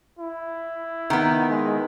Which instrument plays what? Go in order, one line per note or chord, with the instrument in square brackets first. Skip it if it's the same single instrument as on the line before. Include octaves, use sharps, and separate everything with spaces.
[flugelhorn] E4
[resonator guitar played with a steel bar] D#3 B3
[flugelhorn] G#3